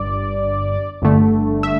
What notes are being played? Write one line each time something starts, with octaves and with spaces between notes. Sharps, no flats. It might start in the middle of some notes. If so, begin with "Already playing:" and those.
Already playing: G1 G2 D5
G1 G2 D3 A3
E5